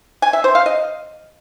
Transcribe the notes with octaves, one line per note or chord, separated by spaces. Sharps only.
G#5
E5
C5
F5
D#5